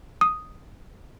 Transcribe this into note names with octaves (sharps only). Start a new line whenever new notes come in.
D#6